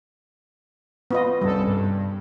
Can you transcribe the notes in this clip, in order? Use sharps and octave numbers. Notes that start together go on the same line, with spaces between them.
B3 F4 D#5
C2 F#2 G3 A4
G2